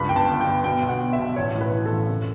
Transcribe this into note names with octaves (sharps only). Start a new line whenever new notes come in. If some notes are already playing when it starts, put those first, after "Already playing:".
Already playing: C#2 G2 B5
G1 G5
A5
G1
G5
G1
B2 G5
B1
F#5
B2
E5
B1
A1 C#5
A2
B4
E3
A4
A1
F#1